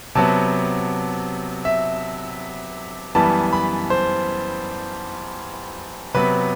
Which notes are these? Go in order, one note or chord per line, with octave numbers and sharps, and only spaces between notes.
C3 F#3 B3 A5
E5
F#2 E3 G3 B3 A5
B5
C5
C3 F#3 B3 B4